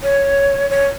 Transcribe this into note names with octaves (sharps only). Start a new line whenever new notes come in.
C#5
C#5